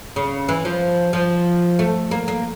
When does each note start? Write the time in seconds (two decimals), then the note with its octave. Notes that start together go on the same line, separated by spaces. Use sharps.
0.16 C#3
0.48 E3
0.65 F3
1.13 F3
1.79 A3
2.11 A#3
2.28 A#3